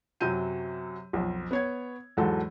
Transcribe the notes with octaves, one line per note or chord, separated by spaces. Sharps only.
F#2 C3 F#3 G6 D#7
B1 F2
B3 C#5 G#6
E2 G#2 F#3 A4